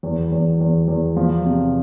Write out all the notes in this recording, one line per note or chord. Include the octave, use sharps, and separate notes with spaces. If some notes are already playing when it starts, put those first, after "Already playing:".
E2
E2
E2
E2
F3
C3